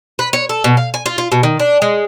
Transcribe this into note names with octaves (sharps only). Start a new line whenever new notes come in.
B4
C#5
A4
B2
F5
G#5
F4
F4
B2
D#3
D4
G#3